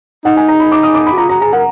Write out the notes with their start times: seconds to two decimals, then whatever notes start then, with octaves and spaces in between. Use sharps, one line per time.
0.25 D#4 F#5
0.37 G#5
0.48 A#5
0.60 B5
0.72 D6
0.83 D#6
0.95 D6
1.07 B5
1.13 F#4
1.17 F4 A#5
1.29 F#4 A#5
1.41 G#4 A#5
1.53 A#4 F#5